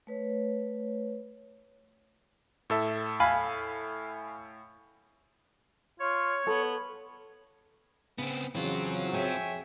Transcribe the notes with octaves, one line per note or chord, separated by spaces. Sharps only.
A3 B4 C#5
A2 A4 E5
F5 G#5 B5
F4 C#5
B3 A4
C#3 B3 C4
C#3 E3 F#3 C4 F4
F2 G#4 C#5 E5 G5 G#5